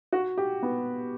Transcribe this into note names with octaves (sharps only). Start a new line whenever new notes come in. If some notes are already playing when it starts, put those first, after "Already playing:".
F#4
G4
B3